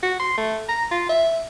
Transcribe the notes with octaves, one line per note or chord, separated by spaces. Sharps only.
F#4
C6
A3
A#5
F4
E5